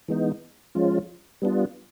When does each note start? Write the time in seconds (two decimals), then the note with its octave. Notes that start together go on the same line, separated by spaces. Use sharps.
0.08 E3 G#3 B3 D#4
0.75 F3 G#3 C#4 F4
1.42 G3 B3 D4 F4